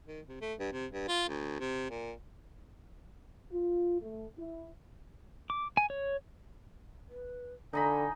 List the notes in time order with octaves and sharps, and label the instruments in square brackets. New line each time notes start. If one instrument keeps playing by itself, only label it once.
[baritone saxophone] D#3
C3
A3
G2
C3
G2
F4
D2
C3
A#2
[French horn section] F4
A3
E4
[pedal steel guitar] D6
G#5
C#5
[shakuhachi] B4
[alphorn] D3 [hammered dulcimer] D#4 D#5 B5 [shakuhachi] G#5